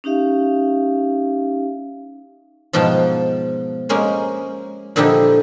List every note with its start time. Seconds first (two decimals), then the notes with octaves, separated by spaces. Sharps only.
0.04 C#4 D#4 G4 E5 F5
2.73 G#2 B2 F3 F4 G5 A5
3.89 G#3 A#3 C#4 C5
4.96 A#2 D3 F3 D#4 E4 G4